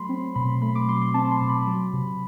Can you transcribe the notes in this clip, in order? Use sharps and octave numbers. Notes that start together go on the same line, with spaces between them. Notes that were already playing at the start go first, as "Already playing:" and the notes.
Already playing: F#3 A3 B5 C6
C4
B2 B5
A3 B5
D6
F#3 C6
C6
C4 A5
C6
B2
B5
F#3
C3